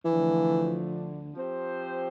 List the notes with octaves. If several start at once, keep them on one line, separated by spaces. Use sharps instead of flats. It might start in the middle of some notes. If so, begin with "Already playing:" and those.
D2 D3 E3 F3 A3 D4
F3 C4 G4 C5